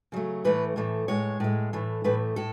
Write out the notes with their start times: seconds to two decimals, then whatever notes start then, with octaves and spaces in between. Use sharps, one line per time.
0.12 C#3 F#3 A3
0.44 A2 E3 A3 B4
0.76 A2 E3 A3
1.08 A2 G#3 C#5
1.40 A2 G#3
1.73 A2 E3 A3
2.04 A2 E3 A3 B4
2.36 A2 A4